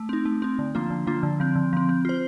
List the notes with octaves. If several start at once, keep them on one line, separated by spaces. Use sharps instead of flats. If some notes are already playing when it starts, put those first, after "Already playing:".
Already playing: A3
C4 D#4
A3
C4 D#4
D3
F3 A#3 D4 F4
D3
F3 A#3 D4 F4
D3
F3 C4
D3
F3 C4
C4
F4 C5